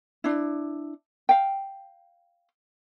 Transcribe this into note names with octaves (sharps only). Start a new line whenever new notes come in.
D4 E4
F5 G5